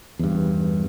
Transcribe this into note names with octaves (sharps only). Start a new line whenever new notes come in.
E2 G2